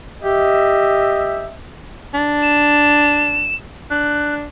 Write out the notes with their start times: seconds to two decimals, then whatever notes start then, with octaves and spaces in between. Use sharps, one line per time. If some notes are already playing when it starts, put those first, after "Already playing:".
0.23 G4 D#5 E5
2.14 D4
2.42 E7
3.90 D4 F#6